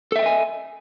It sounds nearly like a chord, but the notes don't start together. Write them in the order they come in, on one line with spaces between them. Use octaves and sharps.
A4 E5 G5 D#5 G#5